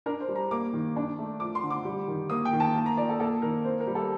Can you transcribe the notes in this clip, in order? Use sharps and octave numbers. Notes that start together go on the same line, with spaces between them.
D4 A#4
C5
G3
A#5
A#3 D6
D#3
D4
A3
F3 D6
C6
D3
D6
G3
D#3
A#3 D#6
G5
D#3
A5
A#3
A#5
F3 D5
A4
A#3 A4
D#3 A#4
C4 C5
A#4
G3
A4